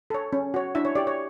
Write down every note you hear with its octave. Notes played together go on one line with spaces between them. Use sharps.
A4 C#5
C#4
F#4 C#5
D4 E4 E5
C#5
G4 C#5 D5
C#5